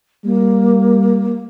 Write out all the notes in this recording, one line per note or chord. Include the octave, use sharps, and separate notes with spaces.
G3 A#3